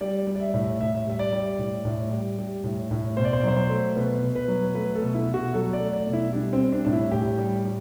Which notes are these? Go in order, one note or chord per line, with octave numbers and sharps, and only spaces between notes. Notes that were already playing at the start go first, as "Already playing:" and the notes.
G3 D5
G3
D5
E5
A2
A2 E5
E5
G3 E5
D5
G3
A2
A2
G3
G3
A2
A2
B2 C5
D5
C5
D5
F#3 C5
C5
A3
B2 B4
B2
B4
F#3
A3 B4
A4
B2
E4
B2
F#4
F#3 A4
D5
A3
D5
B2
E4
G3 D4
C4
G3
D4
A2 D4
E4
A2 G4
G3
G3